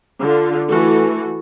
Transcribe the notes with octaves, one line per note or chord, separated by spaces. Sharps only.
D3 F4
E3 A3 F#4 A4